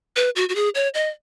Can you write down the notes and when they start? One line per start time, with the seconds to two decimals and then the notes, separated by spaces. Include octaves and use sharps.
0.16 B4
0.36 F#4
0.49 F#4
0.55 G#4
0.75 C#5
0.94 D#5